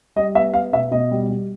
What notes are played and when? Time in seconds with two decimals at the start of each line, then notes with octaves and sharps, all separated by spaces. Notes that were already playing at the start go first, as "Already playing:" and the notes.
0.16 G3 D#5
0.35 B3 E5
0.54 B3 F5
0.73 B2 E5
0.91 B2 D#5
1.11 G3
1.29 G3